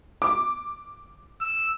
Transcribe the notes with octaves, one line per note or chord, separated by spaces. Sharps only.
D6
E6